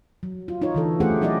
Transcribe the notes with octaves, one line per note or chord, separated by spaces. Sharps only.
F#3
F4
D#4 F4 C#5
D3 E3 A4
A3 C#4 G4 G#4 C5 F#5
F#3 E4 G4 D5 D#5